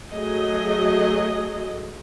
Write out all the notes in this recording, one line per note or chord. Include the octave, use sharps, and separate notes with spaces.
F#3 A3 G#4 D#5